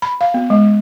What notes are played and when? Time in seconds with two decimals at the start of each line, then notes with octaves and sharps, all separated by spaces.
0.02 B5
0.21 F5
0.34 B3
0.50 G#3